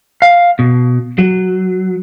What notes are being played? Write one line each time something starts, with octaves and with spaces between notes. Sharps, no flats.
F5
B2
F#3